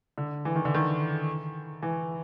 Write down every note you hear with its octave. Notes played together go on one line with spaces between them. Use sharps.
D3
E3
D#3
D3
D#3
E3